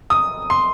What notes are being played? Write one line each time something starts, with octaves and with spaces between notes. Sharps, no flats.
D#6
C6